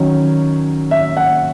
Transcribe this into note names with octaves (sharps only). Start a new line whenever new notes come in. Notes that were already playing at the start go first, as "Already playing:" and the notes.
Already playing: D#3 F#3 C#4
E5
F#5